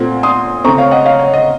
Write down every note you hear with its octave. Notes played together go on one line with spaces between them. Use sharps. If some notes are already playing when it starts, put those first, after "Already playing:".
Already playing: A#2 A3 C4 F#5
C6 D#6
C#3 A3 C4 A#5 C#6
C#5 F5
D#5 F#5
C#5 F5
C#5
D#5